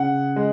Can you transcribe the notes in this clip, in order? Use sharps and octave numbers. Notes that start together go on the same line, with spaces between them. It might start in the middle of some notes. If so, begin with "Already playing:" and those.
Already playing: C#3 F#5
G#3